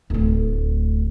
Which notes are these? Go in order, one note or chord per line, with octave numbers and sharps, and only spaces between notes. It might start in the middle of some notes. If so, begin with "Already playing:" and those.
D1 D2